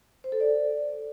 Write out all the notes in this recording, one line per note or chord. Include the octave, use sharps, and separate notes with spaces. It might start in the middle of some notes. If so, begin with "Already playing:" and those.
C5
A4
D5